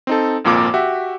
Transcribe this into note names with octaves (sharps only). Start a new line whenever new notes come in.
C4 D#4 A4
G#1 F2 A#2 A#3 D6
F#4 G4 E5